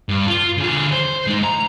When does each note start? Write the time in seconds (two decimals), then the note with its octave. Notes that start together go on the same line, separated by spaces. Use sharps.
0.09 G2
0.28 F4
0.57 D3 G#4
0.92 C5
1.27 G#3 D#4
1.44 A#5